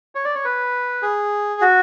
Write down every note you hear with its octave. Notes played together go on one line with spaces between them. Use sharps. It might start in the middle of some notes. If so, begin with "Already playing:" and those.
C#5
D5
C#5
B4
G#4
F#4